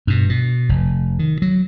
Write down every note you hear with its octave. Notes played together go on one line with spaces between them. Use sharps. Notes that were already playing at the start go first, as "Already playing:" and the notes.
G2 B2
B2
F1
D#3
F#3